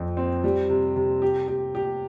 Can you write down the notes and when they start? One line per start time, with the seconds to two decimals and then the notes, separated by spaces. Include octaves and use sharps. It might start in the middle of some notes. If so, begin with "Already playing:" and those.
Already playing: F2 C4
0.17 C4
0.44 G3
0.70 C3
0.96 C3
1.22 G4
1.48 G4
1.75 G4